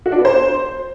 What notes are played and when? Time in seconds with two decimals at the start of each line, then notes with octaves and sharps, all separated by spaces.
0.06 F#4
0.12 D4
0.18 B3
0.25 C5